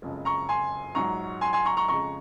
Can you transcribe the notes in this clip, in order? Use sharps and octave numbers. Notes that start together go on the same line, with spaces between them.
F#1 F2 C#3 G#3
A#5 C#6
G#5 C6
A#1 G#2 F#3 A#5 C#6
G#5 C6
G#5 C6
A#5 C#6
A#5 C#6
F2 C#3 G#3 A#5 C#6